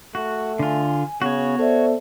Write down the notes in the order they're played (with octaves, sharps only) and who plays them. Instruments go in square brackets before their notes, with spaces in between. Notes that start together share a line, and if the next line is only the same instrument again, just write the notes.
[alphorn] A3 [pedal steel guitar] F#4
[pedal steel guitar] D3 F4 [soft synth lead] G#5
[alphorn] C#3 [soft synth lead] B3 [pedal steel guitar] F#4 C#5
[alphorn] A4 [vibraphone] C5 D5 E5